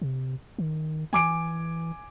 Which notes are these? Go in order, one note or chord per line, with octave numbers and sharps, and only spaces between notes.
C3
D#3
E3 G#5 D6 D7